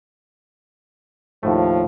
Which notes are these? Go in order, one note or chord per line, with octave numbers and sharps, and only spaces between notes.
D#2 A2 F3 A3